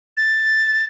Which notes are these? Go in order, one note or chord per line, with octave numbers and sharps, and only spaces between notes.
A6